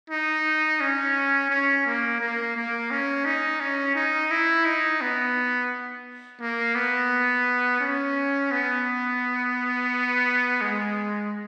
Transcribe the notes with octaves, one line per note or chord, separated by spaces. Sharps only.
D#4
C#4
C#4
A#3
A#3
A#3
C#4
D#4
C#4
D#4
E4
D#4
B3
A#3
B3
C#4
B3
G#3